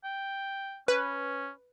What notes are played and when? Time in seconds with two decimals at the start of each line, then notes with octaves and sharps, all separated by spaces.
0.04 G5
0.88 C#4 B4